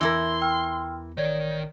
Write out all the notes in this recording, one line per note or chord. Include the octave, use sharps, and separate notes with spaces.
E2 E3 E4 A#4 C6
G5 E6 F6
A1 D#3 C#5 D5 G#6